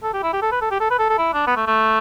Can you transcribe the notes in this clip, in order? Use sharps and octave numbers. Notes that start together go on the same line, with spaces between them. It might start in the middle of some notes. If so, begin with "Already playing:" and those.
A4
G4
E4
G4
A4
B4
A4
G4
A4
B4
A4
A4
E4
D4
B3
A3
A3